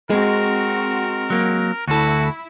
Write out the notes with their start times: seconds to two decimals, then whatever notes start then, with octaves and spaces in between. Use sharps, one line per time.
0.10 G#3 C4 F#4 A#4
1.30 F#3 A#3
1.88 D2 E4 F#4 A4